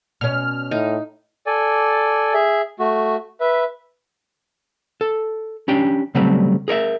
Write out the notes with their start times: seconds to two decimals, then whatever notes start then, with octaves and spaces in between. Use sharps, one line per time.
0.21 B2 C#4 F6
0.71 A2 D#4
1.47 A4 D5 G#5
2.34 G#4 E5
2.79 A3 F#4
3.40 B4 E5
5.01 A4
5.68 C#4 D4 G4 G5
6.15 C#3 F#3 G3 A3 C4
6.68 G#4 A#4 C#5 E5